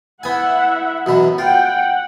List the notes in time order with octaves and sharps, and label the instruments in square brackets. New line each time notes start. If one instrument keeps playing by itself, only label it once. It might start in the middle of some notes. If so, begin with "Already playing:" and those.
[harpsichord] B3 G#5 [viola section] E4 E5 F#5
[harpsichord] F#2 B2 E3 [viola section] B3
[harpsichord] F4 [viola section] F#5 G5
[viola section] F#5